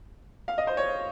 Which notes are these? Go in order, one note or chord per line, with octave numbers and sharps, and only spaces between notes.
F5
D#5
C5
C#5